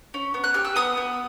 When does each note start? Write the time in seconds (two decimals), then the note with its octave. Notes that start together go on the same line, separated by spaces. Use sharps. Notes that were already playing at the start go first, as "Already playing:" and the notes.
0.14 C#4
0.34 B3
0.44 F#6
0.54 G4 F6
0.65 E6
0.76 B3 D#6
0.97 B3